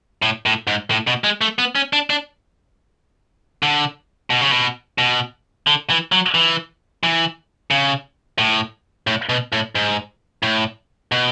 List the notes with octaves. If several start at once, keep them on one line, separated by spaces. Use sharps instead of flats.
A2
A2
G#2
A2
B2
G#3
A3
B3
C#4
D4
D4
D3
B2
C#3
B2
B2
D3
E3
F#3
E3
E3
C#3
A2
A2
B2
A2
G#2
A2
B2